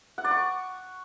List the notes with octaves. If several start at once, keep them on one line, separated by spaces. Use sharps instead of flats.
F#5
D5
C#6